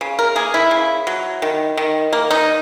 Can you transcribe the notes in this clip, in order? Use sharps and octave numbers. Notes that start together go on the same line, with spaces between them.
C#3
A#4
A#3 G#4
E4
C#3
F#3
D#3
D#3
A#3
D#4